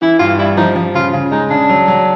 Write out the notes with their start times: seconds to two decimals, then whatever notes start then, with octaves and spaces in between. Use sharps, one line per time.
0.02 E3 E4
0.19 G2 F4
0.39 G3 E4
0.57 F3 D#4
0.76 F3
0.94 C#3 F4
1.13 C#3
1.32 G#3 D#4
1.50 C#3 D4
1.69 F#3
1.88 F#3